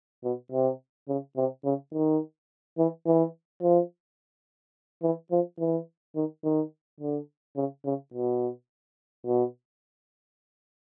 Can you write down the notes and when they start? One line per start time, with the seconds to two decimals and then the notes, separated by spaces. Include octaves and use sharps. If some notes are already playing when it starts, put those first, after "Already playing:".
0.24 B2
0.52 C3
1.09 C#3
1.37 C3
1.65 C#3
1.93 D#3
2.78 E3
3.06 E3
3.62 F3
5.03 E3
5.31 F3
5.60 E3
6.16 D#3
6.44 D#3
7.00 D3
7.57 C#3
7.85 C#3
8.14 B2
9.26 B2